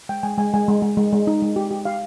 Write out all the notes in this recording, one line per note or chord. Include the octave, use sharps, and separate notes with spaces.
G#3 G5
G#3 G#5
G#3 G#5
G#3 G#5
G#3
G#3
G#3
G#3
D#4
G#3
G4
G4
G4 F5